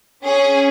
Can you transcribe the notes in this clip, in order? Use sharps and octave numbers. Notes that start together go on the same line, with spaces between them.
C#4 G#4